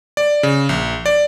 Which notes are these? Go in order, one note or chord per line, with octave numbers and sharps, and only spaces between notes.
D5
C#3
A#1
D5